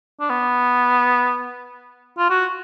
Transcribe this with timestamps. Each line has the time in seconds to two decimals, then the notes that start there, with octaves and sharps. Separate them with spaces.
0.20 D4
0.30 B3
2.18 F4
2.30 F#4